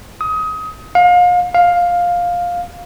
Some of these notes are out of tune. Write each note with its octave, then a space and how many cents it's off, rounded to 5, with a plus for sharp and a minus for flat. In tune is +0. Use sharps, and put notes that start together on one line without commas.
D#6 +25
F5 +35
F5 +10